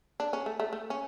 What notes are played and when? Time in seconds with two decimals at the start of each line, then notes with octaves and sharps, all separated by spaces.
0.20 D4
0.33 C#4
0.46 A3
0.60 A3
0.73 A3
0.90 C#4